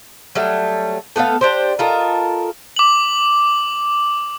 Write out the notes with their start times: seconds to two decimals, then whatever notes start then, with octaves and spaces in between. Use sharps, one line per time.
0.35 F#3 G3 A3
1.16 A3 B3 A4 F5
1.41 D4 G4 C5
1.79 F4 A4 A#4 D#5
2.76 D6 F#7